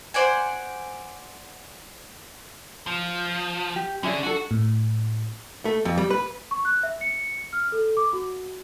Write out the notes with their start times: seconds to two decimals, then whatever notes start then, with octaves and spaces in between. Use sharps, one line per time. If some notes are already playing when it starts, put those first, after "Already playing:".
0.14 C5 D5 F#5 G#5
2.87 F3
3.76 G4
4.03 D3 C#4 D4 G#4 E5
4.23 D4 F#4 A4
4.51 A2
5.65 A3
5.85 F2
5.97 G3
6.10 B4
6.51 C#6
6.65 F#6
6.83 E5
7.01 C#7
7.53 F6
7.72 A4
7.97 D6
8.13 F#4